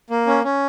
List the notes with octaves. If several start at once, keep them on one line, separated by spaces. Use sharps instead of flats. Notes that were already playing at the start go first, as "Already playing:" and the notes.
A#3
C#4
C#4